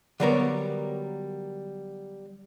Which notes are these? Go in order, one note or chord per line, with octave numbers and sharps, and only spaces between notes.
D3 F#3 G3 B3 A#4 C#5